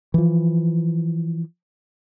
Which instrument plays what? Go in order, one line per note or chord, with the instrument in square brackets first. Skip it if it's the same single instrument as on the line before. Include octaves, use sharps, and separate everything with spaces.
[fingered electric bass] E3 F3